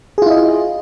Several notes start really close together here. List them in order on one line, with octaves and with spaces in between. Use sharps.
G#4 F4 E4 D#5